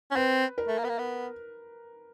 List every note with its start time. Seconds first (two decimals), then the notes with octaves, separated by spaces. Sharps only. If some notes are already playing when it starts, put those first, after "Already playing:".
0.11 C#4
0.16 C4 B4
0.58 A#4
0.68 A3
0.78 A#3
0.84 B3
0.89 A#3
0.99 B3